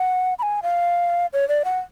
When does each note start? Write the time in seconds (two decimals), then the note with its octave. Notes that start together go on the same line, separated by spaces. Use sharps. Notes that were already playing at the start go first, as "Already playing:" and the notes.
Already playing: F#5
0.39 B5
0.43 G#5
0.63 F5
1.33 C#5
1.49 D5
1.65 F#5